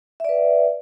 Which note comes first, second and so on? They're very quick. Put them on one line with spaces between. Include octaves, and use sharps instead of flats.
E5 D5 B4 F#5